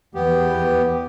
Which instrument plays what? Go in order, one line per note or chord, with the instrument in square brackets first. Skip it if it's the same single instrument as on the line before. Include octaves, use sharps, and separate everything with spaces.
[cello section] E2 [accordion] B3 G4 [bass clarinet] B4